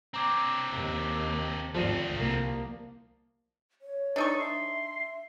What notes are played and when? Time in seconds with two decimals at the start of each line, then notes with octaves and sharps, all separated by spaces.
0.14 C4 D4 A#5 D6 G#6
0.72 D#2
1.74 G#1 D2 F3 A3 C4 D5 D#7
2.15 C2 A#3
3.82 C#5
4.16 D4 D#4 A4 C#6
4.39 E5 C6